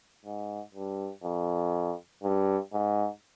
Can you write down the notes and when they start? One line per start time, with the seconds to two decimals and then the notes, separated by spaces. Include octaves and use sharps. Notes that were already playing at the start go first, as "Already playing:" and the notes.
0.25 G#2
0.75 G2
1.23 F2
2.23 G2
2.73 G#2